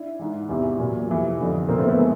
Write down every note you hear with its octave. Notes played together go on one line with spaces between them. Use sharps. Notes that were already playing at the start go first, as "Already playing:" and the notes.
Already playing: D4 E4
G#2 E3
E2 C3 E3
A#2 F#3
F2 C3 E3
F2 D3 F3
A#2 F3 A#3 C4
A3 B3
A3 B3
E3 G#3 A#3